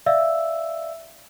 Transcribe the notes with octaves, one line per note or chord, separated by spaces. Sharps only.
D5 E5 F5 E6